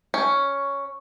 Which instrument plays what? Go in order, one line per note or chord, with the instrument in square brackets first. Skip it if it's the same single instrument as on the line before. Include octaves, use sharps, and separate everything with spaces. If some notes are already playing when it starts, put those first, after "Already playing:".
[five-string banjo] C#4